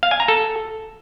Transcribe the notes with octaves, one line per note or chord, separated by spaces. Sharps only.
F5
G#5
A#5
A4